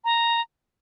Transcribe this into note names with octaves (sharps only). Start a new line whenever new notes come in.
A#5